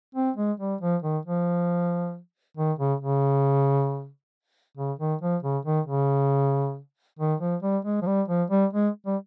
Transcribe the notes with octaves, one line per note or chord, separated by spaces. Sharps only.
C4
G#3
G3
F3
D#3
F3
D#3
C#3
C#3
C#3
D#3
F3
C#3
D#3
C#3
D#3
F3
G3
G#3
F3
G3
F3
G3
G#3
G3